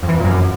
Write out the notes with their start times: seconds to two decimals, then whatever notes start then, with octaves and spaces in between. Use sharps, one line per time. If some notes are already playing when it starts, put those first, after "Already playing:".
0.02 F2
0.08 E3
0.13 F2
0.18 A#2
0.24 F#2